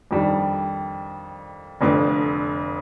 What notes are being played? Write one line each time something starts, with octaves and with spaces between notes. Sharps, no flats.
F2 D#3 G3 D4
F1 F2 D3